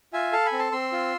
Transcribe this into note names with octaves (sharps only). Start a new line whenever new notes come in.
F4 E5 G#5
A4 F5 A5
G#5 B5
C4
A5 C6
C4 C6 E6
F4